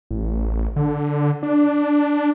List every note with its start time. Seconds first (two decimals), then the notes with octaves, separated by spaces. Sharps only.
0.11 A1
0.76 D3
1.43 D4